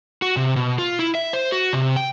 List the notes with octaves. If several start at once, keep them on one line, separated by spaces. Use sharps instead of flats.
F#4
C3
B2
F4
E4
E5
C5
F#4
C3
G5